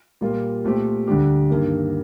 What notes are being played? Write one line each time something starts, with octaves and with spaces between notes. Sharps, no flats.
A#2 G3 A#3 F4
A#2 A3 C4 G4
D2 D3 G3 D4 G4
G2 D#3 A#3